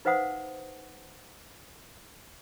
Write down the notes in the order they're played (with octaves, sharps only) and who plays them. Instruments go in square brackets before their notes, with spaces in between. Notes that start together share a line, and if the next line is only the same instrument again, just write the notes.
[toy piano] D#4 B4 C5 F5 F#5 D#6